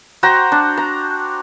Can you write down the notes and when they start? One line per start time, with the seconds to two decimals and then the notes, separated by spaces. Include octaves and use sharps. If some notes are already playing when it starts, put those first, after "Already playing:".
0.23 F#4 C5 G5 A#5
0.52 D4
0.77 A#5